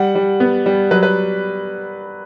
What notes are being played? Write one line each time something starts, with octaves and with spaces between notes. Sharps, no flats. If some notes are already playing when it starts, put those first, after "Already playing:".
Already playing: G3 F#5
G3
B3
G3
F#3 B4
B4